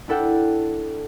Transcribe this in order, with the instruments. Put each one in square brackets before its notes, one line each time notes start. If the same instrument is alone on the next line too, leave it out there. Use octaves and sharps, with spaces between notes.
[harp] D4 E4 A4 F#5 G5